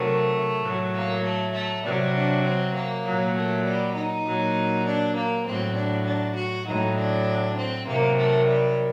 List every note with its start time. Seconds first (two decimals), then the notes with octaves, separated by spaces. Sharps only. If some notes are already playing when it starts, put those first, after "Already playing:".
Already playing: C3 D#3 F#3 A3
0.63 A2 F#3
0.94 A#3
1.24 A3
1.54 A3
1.84 C3 F#3 G3
2.15 D4
2.45 C4
2.75 A#3
3.05 A#2 F#3
3.36 A3
3.65 G3
3.95 D#4
4.26 A#2 F#3
4.87 D4
5.16 A#3
5.46 A2 F#3 C4
5.76 D4
6.07 D4
6.36 F#4
6.67 A2 F#3 D#4
6.97 D4
7.58 C4
7.87 C3 D#3 F#3 A#3
8.18 A3
8.48 G3